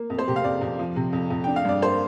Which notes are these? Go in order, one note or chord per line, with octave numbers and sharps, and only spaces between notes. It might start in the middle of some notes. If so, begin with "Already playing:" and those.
Already playing: A#3
F2
C5
C3 G4
F5
F2 D5
F2
F3
C3
F2
F2
D4 G5
F5
G2 D5
A#3 C5